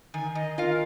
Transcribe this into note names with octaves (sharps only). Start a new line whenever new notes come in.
D#3 G#5
D#3 D#5
F4 A#4 F5